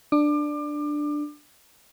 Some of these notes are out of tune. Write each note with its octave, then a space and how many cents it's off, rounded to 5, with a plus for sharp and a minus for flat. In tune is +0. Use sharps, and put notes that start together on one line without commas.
D4 +10 D6 +30